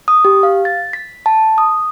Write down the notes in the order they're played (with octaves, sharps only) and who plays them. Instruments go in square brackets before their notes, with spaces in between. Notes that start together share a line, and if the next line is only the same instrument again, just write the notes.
[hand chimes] D#6
G4
F5
A6
B6
A5
D#6